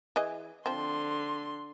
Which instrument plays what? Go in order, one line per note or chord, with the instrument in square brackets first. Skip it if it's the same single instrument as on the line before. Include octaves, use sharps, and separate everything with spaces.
[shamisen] E3 G#4 D#5
[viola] D3 C6 [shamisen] F3 C4